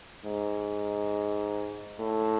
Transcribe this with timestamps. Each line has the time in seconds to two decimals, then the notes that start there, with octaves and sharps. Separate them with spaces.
0.25 G#2
2.00 A2